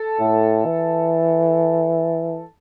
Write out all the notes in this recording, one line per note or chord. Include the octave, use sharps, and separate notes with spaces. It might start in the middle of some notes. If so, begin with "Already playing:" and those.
Already playing: A4
A2
E3